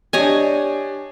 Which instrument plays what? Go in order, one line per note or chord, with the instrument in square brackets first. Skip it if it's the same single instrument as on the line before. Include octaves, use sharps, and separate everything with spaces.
[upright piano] D4 G4 [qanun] C#5 D#5 G#5